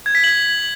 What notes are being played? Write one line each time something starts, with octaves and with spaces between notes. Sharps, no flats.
G#6
B6
F#7